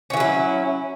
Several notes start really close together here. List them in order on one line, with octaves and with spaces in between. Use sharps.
C#4 E3 F#3 E4